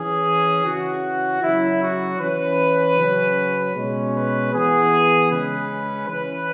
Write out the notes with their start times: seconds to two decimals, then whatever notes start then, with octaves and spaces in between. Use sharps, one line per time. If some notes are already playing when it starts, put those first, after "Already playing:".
Already playing: E3 C#4 G#4
0.65 C#3 E3 C#4 F#4
1.42 C#3 F#3 C#4 E4
1.81 F#4
2.19 E3 C#4 B4
2.97 C#3 F#3 C#4
3.74 B2 G#3 C#4
4.14 B4
4.52 E3 B3 G#4
5.30 C#3 G#3 C#4 B4
6.07 E3 C#4 B4